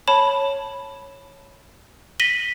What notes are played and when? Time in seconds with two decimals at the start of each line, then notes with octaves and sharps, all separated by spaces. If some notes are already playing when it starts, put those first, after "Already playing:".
0.08 C#5 A5 B5
2.20 A#6 B6 D#7 F#7 G7